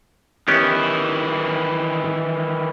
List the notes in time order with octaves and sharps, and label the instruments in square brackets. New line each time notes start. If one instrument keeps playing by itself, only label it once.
[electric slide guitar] D#3 E3 E4 [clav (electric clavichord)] B3 C#4 G4